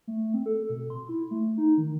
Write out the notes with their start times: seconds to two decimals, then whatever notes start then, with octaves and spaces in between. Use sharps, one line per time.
0.08 A3
0.34 C4
0.46 A4
0.70 B2
0.90 C6
1.09 E4
1.31 A3
1.58 D#4
1.78 D#3